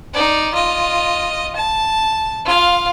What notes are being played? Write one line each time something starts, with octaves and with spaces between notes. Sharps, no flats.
D#4 D5
F4 D#5
A5
F4 F5